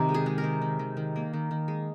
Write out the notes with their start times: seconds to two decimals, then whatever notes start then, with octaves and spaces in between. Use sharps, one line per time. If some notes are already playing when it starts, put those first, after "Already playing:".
Already playing: C3 D#3 A#4
0.09 G#3
0.14 G#4
0.26 G#3
0.38 A#4
0.44 D#3
0.62 D#3
0.79 D#3
0.97 D#3
1.16 A#3
1.33 D#3
1.51 D#3
1.68 G#3